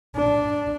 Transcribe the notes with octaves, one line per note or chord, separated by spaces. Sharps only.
D4